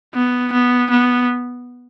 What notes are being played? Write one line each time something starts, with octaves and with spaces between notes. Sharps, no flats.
B3
B3
B3